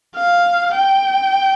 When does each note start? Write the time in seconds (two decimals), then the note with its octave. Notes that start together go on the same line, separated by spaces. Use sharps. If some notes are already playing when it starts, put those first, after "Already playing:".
0.16 F5
0.76 G5